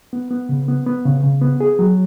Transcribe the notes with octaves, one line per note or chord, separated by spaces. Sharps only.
B3
B3
C#3
B3
B3
C#3
C#3
B3
G#4
F#3